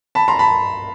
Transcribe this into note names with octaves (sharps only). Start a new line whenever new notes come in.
A5 B5
A#5 C6
A5 B5